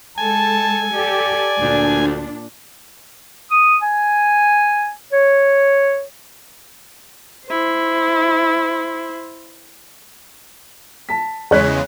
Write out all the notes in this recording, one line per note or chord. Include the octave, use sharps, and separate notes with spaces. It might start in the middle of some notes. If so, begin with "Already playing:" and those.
G#3 A4 G#5 A5
G4 A4 D5
D2 A#2 D4
D#6
G#5
C#5
E4 C5
A5 B6
E2 C#3 G#3 C#5 F#6 B6